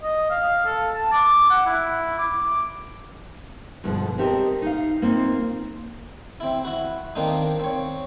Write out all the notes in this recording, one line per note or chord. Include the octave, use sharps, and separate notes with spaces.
D#5
F5
A4
A5
D6
F#5
E4
D6
G2 B2 D3 F3 G#3
C4 G4 A4 A#4 C5 D#5
D#4 F5
A#3 C4 D#4 F4
C4 E4
E4 F#4
D#3 A#3 C4 D4 D#4
C4 C#5